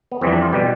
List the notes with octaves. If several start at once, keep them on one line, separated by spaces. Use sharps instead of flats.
B3
F2 E3 G3 C4
D4
F4
B2 G3 G4